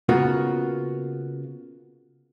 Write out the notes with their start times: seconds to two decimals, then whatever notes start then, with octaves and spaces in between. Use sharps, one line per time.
0.09 C#3 A#3 B3 F4 F#4